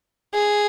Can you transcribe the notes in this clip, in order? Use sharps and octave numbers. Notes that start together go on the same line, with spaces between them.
G#4